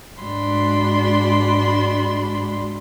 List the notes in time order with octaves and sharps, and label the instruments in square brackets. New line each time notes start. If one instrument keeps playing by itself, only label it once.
[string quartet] G#2 G#3 D4 F#4 B5 C6